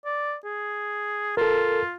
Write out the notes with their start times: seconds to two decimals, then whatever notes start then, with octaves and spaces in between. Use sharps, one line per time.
0.05 D5
0.44 G#4
1.37 F4 A4 A#4